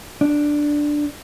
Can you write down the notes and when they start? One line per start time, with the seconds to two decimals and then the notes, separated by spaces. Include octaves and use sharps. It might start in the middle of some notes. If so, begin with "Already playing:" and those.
0.21 D4